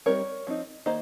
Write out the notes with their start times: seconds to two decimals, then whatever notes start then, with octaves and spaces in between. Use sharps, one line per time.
0.06 G3 C4 D#4 A#4 C#5
0.47 F3 C4 D#4
0.86 D#3 A#3 C5 D#5